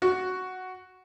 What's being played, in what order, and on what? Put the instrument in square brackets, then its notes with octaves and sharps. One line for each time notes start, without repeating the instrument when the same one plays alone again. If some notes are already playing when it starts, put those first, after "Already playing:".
[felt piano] F#4